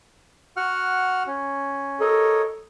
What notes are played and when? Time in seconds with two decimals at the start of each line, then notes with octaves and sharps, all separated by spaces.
0.57 F#4 F#5 F6
1.27 C#4
2.00 A4 A#4 C#5 D#5